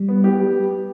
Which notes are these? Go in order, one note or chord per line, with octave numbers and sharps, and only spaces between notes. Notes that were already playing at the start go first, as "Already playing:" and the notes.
Already playing: G3
B3
G4
G3